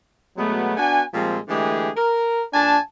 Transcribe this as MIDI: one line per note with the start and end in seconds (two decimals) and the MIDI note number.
0.37 0.75 47
0.37 0.75 54
0.37 0.75 56
0.37 0.75 57
0.37 0.75 59
0.77 1.03 59
0.77 1.03 62
0.77 1.03 66
0.77 1.03 80
1.13 1.39 46
1.13 1.39 53
1.13 1.39 55
1.13 1.39 56
1.13 1.39 60
1.49 1.90 50
1.49 1.90 52
1.49 1.90 56
1.49 1.90 57
1.49 1.90 67
1.49 1.90 68
1.97 2.42 70
2.54 2.78 46
2.54 2.78 62
2.54 2.78 80
2.54 2.78 81